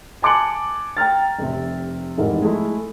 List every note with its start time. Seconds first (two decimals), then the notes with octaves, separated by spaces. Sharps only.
0.22 G#5 A5 D6 F#6 C#7 F#7
0.97 G5 A#5 F6 A6
1.38 F1 C3
2.17 F1 G#2 E3 A#4
2.42 G#3 A3 E4